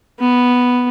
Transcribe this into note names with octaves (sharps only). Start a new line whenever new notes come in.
B3